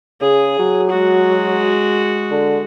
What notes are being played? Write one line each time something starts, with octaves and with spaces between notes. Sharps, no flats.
C#3 G#4
F#3
G#3 F#4
D3